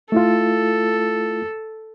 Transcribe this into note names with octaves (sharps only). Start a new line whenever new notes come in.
A3 E4 F4 A4